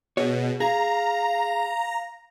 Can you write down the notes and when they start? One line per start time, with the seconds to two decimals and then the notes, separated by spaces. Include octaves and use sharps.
0.17 B2 G#4 C#5
0.60 G#4 F5 A#5